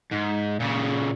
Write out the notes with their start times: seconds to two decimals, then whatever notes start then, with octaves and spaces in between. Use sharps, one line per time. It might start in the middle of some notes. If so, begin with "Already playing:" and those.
0.11 G#2
0.60 A#2 C#3